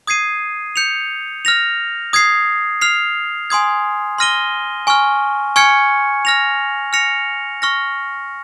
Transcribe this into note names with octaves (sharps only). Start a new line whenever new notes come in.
D#6 G#6 C7 D#7
G6 C#7 F7
F6 A#6 F7
D#6 G#6 C7
F6 C7 F7
G#5 C6 D#6 G#6
C6 F6 A#6 D#7 G7
G#5 C#6 F6
G#5 C#6 F6 G#6 C#7
F6 A#6 F7
F6 A#6 C#7 F7
C#6 F6 A#6